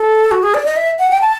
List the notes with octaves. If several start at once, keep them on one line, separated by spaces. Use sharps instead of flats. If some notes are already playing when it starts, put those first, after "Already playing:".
Already playing: A4
F#4
G#4
D5
D#5
E5
F#5
G5
A5